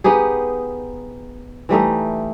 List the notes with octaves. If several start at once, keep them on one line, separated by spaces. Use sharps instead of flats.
B3 D#4 G4 G#4
E3 G3 A3 D#4